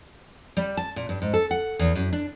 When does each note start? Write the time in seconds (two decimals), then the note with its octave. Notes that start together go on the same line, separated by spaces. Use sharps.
0.57 G3
0.77 A5
0.96 A#2
1.09 G2
1.22 G#2
1.34 A4
1.51 F#5
1.79 E2
1.95 F#2
2.13 D4